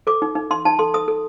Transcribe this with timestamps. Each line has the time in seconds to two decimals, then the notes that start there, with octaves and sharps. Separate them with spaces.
0.07 A4 D6
0.22 D#4
0.35 D#4
0.50 D#4 C6
0.65 D#4 A5
0.79 A4 C6
0.94 A4 D#6
1.08 A4